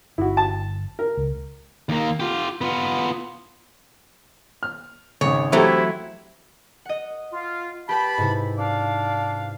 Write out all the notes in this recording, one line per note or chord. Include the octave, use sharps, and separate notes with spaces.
G1 E4 F#4
A5
A#4
C#2
D#2 A#3
F4 G4
B3 F4
F6
G#1 C#3 C#5
E3 F#3 A3 C4 E4 G4
D#5 F#5
F4
G4 B4 G5 A5 B5
G#2 C3 E4
D4 D5 F5